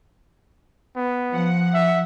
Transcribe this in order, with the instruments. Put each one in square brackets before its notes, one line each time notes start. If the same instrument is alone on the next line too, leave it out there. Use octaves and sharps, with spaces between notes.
[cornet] B3
[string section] F3 F#5
[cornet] E5